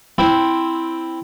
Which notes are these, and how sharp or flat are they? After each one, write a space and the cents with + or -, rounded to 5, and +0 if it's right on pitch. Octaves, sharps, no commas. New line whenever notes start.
C4 +0 E4 +0